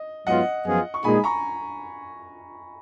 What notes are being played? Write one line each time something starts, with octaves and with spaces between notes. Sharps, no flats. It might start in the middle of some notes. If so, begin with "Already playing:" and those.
Already playing: D#5
G#2 F#3 B3 F4 D#5 F#5
F#2 F3 B3 F4 G#4
C#6
A#2 G#3 D#4 G#4 G#5 B5
A#5 C#6